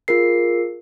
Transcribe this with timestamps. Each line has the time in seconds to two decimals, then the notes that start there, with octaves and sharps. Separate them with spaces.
0.08 F4 G#4 A#4 C7